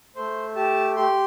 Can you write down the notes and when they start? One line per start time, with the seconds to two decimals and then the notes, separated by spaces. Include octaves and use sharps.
0.16 A3 C5
0.55 G4 A5
0.96 G4 C6